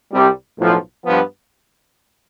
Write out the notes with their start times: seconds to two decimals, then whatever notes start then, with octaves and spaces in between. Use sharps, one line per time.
0.12 C2 C3 G3
0.58 B1 A2 F3
1.03 G2 F3 B3